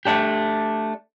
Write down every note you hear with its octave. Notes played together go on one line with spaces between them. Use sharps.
A3 D4 G4